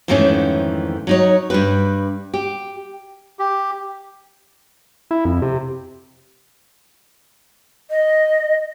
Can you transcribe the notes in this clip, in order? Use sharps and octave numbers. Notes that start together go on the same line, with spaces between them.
F2 G#2 D#3 E3 A3 C#4
F#3 D#4 C#5
G2 G3 B4
G4
G4
E4
F2
C3
D#5